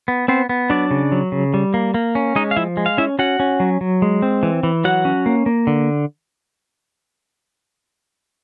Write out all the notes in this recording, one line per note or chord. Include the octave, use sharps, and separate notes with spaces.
B3
B3 C4 C5
B3
F#3 D4 D5
C#3
F#3
C#3
G3
A#3
A#3
C#4
G#3 D#4 D#5
F5
F3 E4 E5
G#3
F5
C#4 E4 E5
C#4 F#4 F#5
C#4
F#3
F#3
G#3
C4
E3
E3
F#3 F#4 F#5
C#4
A#3
A#3
D3